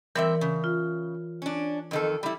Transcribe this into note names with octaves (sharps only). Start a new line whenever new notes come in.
E3 G3 C4 A#4 E5
C#3
F4
C#4 D4
F2 D#3 A4
G3 E4